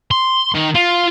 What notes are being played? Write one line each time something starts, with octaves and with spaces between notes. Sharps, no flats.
C6
D#3
F4